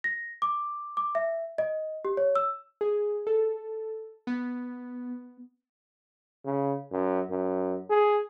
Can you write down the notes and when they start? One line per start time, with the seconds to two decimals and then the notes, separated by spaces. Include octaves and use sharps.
0.04 A#6
0.42 D6
0.97 D6
1.15 E5
1.58 D#5
2.05 G4
2.17 C#5
2.36 E6
2.81 G#4
3.27 A4
4.27 B3
6.45 C#3
6.92 F#2
7.30 F#2
7.90 G#4